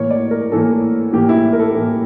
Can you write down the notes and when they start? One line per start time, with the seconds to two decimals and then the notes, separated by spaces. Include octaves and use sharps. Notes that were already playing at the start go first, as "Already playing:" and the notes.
Already playing: A2 E3 A#3 C#5
0.10 D5
0.31 A#4
0.51 A2 E3 A#3 A4
1.13 A2 E3 A#3 G4
1.29 E4
1.53 A#4
1.59 A4
1.75 A2 E3 A#3